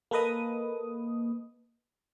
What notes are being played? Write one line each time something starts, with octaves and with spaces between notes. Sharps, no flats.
A#3 A4 B4 D#5 D#6